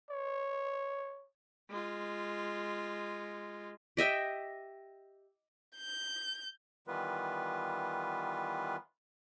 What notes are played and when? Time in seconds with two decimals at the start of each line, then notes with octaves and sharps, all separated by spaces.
0.10 C#5
1.70 G#3 F4
3.97 G4 D#5 E5 G5
5.78 G6
6.87 D#3 E3 G3 B3 F4 B4